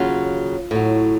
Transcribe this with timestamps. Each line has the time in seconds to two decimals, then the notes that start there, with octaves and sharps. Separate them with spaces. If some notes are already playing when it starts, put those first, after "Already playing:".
Already playing: D#2 C#3 F#3 F4
0.71 A2 F#3